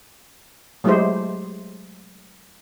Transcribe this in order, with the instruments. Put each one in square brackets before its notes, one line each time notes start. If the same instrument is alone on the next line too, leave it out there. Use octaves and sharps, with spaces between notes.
[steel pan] F#3 G#3 A3 E4 G4 C5